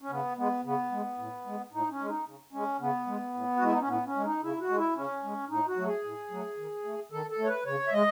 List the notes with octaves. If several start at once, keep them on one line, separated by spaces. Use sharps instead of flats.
C#4
C#3 B3
G#3 B3
C#3 B3
G#3
A2
G#3
A2 D#4
C#4
G#3
D#4
C#3
G#3 C#4
C#3 B3
G#3
A2
F#4
G#3 E4
D#4
C#4
A2 B3
C#4
G#3
D#4
C#3 E4
F#4
G#3
E4
C#3 C#4
G#3
A2 D#4
F#4
F#3 A3
G#4
A2
F#3 A3
D#3
A3
D#3 A4
A4
A3
C#5
B4
C#3 C#5
E5
G#3 D#5